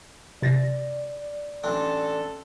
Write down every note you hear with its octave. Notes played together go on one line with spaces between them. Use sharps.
C3 D5 A6 A#6
A1 C4 D4 A4